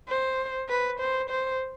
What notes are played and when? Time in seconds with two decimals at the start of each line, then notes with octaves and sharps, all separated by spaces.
0.08 C5
0.69 B4
0.99 C5
1.30 C5